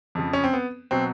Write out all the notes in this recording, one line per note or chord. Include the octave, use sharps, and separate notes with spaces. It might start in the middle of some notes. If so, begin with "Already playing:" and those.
F2 C#3 F3
C#4
C4
B3
B2 F#3 C4